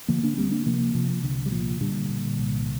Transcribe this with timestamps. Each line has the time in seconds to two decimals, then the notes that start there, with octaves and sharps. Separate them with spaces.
0.08 D3 F3 A#3
0.23 A#3 D4
0.37 D2 G3 C4
0.51 A#3 D4
0.66 C3 F3 A#3
0.95 C3 F3
1.24 C2 D3
1.46 G3
1.51 A#2 F3
1.81 A#2 D3 G3
2.09 A#2
2.38 C2